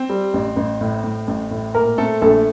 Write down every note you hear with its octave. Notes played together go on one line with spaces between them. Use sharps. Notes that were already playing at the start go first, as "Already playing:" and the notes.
Already playing: C4
G3
A1
A1
A2
A2
A1
A2
A#2 A#3 A#4
A3 C4 A4
A#1 A3 A4